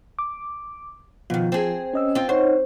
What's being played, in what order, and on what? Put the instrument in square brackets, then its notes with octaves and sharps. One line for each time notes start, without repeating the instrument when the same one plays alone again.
[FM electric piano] D6
[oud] B2 D#3 [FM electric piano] F3 F4
[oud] C4 G#4
[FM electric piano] C#4 D#5 E6
[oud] C4 F4
[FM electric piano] D#4 C#5 F#5 [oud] C5